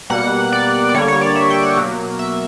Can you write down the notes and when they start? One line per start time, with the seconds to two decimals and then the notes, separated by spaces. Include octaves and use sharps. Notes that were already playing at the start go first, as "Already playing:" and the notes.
0.10 B2 G3 A#3 F#5
0.52 D5
0.89 D5
0.95 D3 G3 A#3 C#5
1.08 C#5
1.21 D5
1.35 E5
1.50 G5
1.63 F#5
1.77 B2 F#3 A#3
2.19 E5